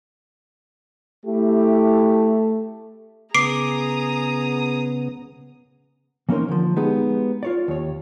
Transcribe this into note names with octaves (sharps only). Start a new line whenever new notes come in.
A3 E4 G4
C#3 B3 G#4 A#5 D6 D#6 C7 D7
E3 A#3 C#4 D#4 A#4 C5
D3 F3
G#3 B3 D#4 G4 G#4
F4 C#5 D5
D#2 C#5